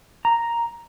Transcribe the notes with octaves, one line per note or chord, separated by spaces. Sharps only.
A#5